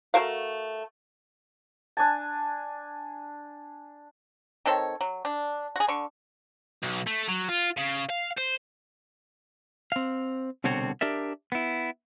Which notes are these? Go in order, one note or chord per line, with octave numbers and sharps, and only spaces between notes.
A3 F#4 A#4 F5
D4 G#5 A5
D#3 C4 A4 C#5
F#3
D4
F#4 G#4
D3 C#6
B1
A3
F#3
F4
C#3
F5
C5
C4 F5
C2 B2 D3 C4 F#4 C#5
D4 G4 A#4 D5 E5
B3 E4